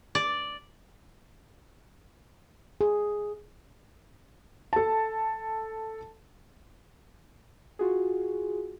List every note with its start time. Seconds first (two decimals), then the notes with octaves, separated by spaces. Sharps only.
0.15 D5
2.81 G#4
4.73 A4 A5
7.79 F4 F#4 G#4